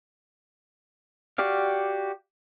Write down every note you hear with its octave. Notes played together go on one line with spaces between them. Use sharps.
F#4 G4 D5 F5